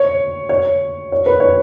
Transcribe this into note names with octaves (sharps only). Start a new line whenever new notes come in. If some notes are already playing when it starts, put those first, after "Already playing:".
Already playing: C#5
C#5
C#5
B4
C#5